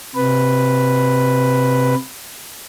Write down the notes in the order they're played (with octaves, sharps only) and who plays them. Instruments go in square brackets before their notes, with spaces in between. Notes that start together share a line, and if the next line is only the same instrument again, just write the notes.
[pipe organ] C3 B4